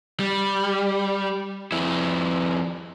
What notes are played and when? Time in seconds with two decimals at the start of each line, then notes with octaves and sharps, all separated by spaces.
0.20 G3
1.72 F2 E4